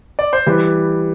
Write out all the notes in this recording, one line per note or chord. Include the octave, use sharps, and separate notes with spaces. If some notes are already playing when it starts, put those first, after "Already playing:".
D5
C5
E3 G3 B4